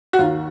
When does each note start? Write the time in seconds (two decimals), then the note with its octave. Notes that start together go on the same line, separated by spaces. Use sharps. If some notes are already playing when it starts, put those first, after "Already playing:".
0.13 F#4
0.19 D#2 D#3 F4